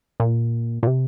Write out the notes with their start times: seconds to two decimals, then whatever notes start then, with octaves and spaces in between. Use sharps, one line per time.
0.20 A#2
0.83 A#2
0.87 C3